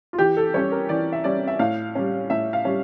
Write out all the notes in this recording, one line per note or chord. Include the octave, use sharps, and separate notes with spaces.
F4
E3 G4
A4
G3 C#4 C#5
A#4
E3 D5
E5
G3 C#4 D5
E5
A2 F5
G3 C#4
A2 E5
F5
G3 C#4